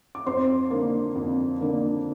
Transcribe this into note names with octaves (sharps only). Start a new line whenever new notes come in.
D6
F2 C5 C6
D3 A#3
F2
D3 A#3